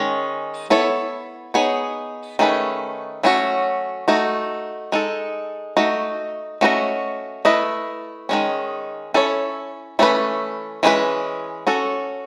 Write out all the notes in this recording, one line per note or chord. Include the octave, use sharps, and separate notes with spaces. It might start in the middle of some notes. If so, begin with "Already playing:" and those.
Already playing: D#3 G#3 C#4 C#5
B3 E4 A4 C#5
B3 D#4 G#4 C#5
D#3 A3 C#4 G#4 B4
F#3 A3 C#4 F#4
A3 D#4 F#4
G#3 D#4 A4
A3 D#4 F#4
A3 C#4 F#4 B4 D#5
A3 E4 B4 D#5
D#3 G#3 C#4
C#4 E4 A4 C#5
E3 A3 C#4 F#4 B4
E3 G#3 C#4 E4 B4
C#4 F#4 A4